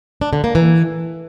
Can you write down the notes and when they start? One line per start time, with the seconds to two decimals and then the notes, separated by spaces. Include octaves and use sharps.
0.21 D4
0.33 D3
0.44 A#3
0.55 E3